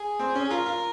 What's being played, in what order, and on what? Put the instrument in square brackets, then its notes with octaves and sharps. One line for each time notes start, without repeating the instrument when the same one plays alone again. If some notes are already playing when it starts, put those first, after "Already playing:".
Already playing: [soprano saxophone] G#4
[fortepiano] C4
C#4
[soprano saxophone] G#4
[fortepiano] F4 [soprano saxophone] A#4
[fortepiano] F4